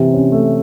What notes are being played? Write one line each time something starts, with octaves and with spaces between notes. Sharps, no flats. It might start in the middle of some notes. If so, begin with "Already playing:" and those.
Already playing: C3 E3
C#4
A3